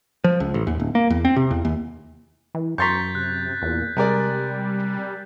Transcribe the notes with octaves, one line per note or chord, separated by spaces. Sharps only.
F3
C#2
A1
D#2
D1
A#3
E2
C4
C3
E2
D#2
E3
F#2 A#5 C6 C#6 G6 A6 B6
C3 F#6
E2 A#2
C3 G3 G#3 A#4 D5